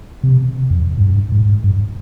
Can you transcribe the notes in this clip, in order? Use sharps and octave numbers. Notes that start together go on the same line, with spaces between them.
C3
F2
G#2
G2
G#2
G2